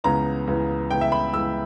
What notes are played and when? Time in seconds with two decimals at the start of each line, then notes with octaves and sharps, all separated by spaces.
0.04 C#2 C#3 E3 B3 A#5
0.47 C#2 C#3 E3 B3
0.90 C#2 C#3 E3 B3 G5
1.01 E5
1.12 B5
1.34 C#2 C#3 E3 B3 E6